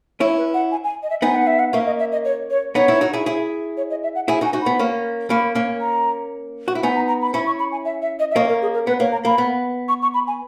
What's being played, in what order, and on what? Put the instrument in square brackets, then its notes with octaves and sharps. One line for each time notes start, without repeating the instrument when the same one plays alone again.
[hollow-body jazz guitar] C#4 E4 [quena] C#5
[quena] B4
F#5
G#5
G#5
D#5
E5
[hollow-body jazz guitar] B3 D#4 [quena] G#5
[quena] F#5
E5
F#5
[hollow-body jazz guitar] A#3 C#4 [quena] E5
[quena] D#5
E5
D#5
C#5
C#5
[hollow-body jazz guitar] B3 D#4 [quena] C#5
[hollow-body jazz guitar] C#4 E4
D#4 F#4
E4 G#4
E4 G#4
[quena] C#5
D#5
E5
F#5
[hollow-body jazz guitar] E4 G#4 [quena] G#5
[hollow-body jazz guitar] D#4 F#4
[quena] G#5
[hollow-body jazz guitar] D#4 F#4
[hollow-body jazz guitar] B3 [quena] B5
[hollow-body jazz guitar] A#3 C#4
[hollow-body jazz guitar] A#3 C#4 [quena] B5
[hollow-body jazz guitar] A#3 C#4
[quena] A#5
[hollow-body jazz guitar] F#4
E4
[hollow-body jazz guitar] B3 D#4 [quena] G#5
[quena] A#5
A#5
B5
[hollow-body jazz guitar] C#4 E4 [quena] B5
[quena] C#6
B5
G#5
E5
E5
D#5
E5
[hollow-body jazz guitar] A#3 C#4 [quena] D#5
[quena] A#4
G#4
A#4
[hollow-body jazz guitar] B3 [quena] B4
[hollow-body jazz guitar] A#3 [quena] C#5
[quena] A#5
[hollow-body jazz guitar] A#3 [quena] B5
[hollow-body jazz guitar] B3
[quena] C#6
C#6
B5
G#5